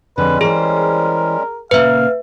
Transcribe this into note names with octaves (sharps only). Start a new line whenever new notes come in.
F2 D3 G3 G#3 C#4 B4
E3 G#4 A#4 C5
A#2 C#3 A#3 B4 E5 F5